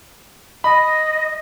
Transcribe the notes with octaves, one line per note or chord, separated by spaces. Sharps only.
D#5 B5